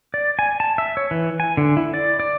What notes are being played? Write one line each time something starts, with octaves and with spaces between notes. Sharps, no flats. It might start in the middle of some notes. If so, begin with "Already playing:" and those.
D5
G#5
A5
E5
C#5
E3
G#5
D3
E4
D5
D5